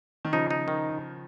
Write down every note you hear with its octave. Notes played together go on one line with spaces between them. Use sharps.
D#3
C#3 F3 D#4
D#4
D#3